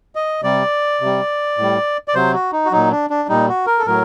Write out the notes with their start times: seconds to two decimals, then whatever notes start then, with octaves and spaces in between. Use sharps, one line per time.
0.15 D#5
0.43 C3 G3 D5
1.01 C3 G3
1.58 A2 G3
2.08 D5
2.15 C3 F#3 C5
2.34 F#4
2.52 D#4
2.65 F#4
2.72 A#2 F#3 D#4
2.91 D4
3.10 D4
3.29 A#2 G3 D#4
3.49 F#4
3.66 A#4
3.78 A4
3.86 A2 F#3 A#4